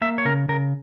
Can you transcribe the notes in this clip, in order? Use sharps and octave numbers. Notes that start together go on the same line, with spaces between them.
A#3 E5
C#5
C#3 A#4
C#3 A#4